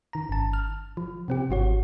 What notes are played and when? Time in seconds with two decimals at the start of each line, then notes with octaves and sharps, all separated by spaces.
0.13 D#3 A#5
0.29 G1 A5
0.53 F6
0.97 F3
1.28 C3 C4 G4
1.49 G#1 F#3 F#4 C#5